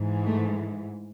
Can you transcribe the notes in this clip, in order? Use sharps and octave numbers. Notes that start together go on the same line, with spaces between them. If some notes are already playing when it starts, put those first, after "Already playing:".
Already playing: G#2 E3
A3